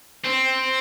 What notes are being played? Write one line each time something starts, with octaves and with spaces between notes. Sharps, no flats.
C4